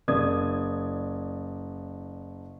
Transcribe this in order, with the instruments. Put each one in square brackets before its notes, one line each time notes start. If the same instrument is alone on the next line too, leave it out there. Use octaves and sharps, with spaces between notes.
[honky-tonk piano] F#1 D5 D#6 G#6